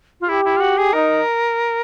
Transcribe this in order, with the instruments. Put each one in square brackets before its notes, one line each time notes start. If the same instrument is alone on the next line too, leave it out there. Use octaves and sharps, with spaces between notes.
[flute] F4
[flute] E4 [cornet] G4
[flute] E4
F4
F#4
G#4
[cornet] D#4 [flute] A#4